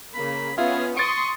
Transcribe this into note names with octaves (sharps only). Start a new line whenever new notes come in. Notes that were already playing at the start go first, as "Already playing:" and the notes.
C#3 A#3 B5
B3 C#4 F4 G#4 E5 F5
C6 C#6 D#6 A6 D7